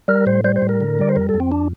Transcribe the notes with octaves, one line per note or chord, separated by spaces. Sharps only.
G3 A#4
A2 C5
G3 C5
C5
A2
A#4
D3
G3 D5
C5
F2 A#4
A4
F2
C4
D4